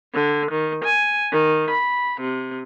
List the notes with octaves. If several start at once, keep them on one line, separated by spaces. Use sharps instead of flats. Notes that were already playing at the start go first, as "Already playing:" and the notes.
D3
D#3
G#5
D#3
B5
C3